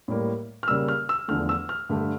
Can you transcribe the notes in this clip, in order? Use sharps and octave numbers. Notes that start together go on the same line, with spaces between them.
A2 G3 A#3
F6
C#3 G3 A#3 E6
F6
E6
E2 D3 F3 A3 F6
E6
F6
G2 D3 A3